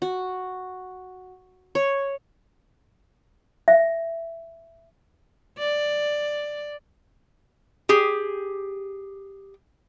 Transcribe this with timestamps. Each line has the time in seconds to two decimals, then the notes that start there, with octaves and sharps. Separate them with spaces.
0.02 F#4
1.75 C#5
3.68 E5
5.59 D5
7.89 G4 G#4